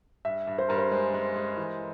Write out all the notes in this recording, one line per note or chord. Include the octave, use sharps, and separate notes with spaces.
G2 E5
G2
C5
G2 A#4
C5
G#3 C5
G#3
G#3
E3